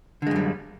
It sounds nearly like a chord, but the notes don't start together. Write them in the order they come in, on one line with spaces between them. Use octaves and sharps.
D3 G#3 F#2 G3